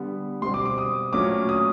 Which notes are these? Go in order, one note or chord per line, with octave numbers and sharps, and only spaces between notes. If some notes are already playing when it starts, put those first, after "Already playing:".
Already playing: D3 G3 B3
B2 G3 C4 C6
D6
D6
D#6
A#2 F#3 A3 C#4 D6
D#6